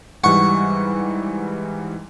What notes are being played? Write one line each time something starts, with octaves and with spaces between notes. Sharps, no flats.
G#2 E3 G3 F#5 C#6